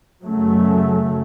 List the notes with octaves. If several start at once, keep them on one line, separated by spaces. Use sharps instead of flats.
F#2 C#3 F#3 A3